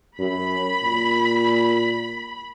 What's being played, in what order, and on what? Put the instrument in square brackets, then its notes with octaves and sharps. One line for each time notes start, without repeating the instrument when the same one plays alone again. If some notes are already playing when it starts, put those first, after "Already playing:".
[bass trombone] F#2 [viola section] B5
[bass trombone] A#2